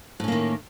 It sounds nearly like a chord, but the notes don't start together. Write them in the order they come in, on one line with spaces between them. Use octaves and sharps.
A2 C#4 A#3 D#3